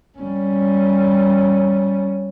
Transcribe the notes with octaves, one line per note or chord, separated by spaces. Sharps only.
G3 C#4